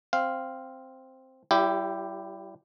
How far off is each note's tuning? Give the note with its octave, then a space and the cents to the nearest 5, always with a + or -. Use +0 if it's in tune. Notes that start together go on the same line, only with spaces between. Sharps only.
C4 +0 F5 +0
G3 -35 E4 +20 G4 +0